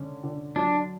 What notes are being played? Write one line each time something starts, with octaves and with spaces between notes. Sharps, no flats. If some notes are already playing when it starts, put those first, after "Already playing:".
Already playing: D3 C#4
D3
F#3 D4